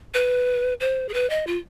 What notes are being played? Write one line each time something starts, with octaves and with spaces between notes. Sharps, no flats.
B4
C5
G#4
B4
D#5
F4